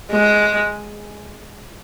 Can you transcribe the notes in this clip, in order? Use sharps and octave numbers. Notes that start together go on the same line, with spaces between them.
G#3